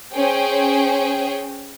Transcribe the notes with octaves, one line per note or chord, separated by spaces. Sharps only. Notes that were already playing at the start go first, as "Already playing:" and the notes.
C#4 G#4 C5 G5